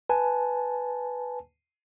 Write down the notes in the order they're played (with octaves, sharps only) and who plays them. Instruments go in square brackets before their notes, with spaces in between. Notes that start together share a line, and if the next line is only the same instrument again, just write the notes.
[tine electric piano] B4 G#5 A5